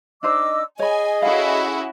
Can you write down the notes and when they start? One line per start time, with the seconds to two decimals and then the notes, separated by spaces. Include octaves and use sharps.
0.23 D4 D#4 C5 D#5 D6 E6
0.79 G#4 C#5 D#5 G#5 B5
1.22 C#4 E4 F#4 A4 F5